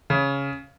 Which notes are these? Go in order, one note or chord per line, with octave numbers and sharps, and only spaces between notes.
C#3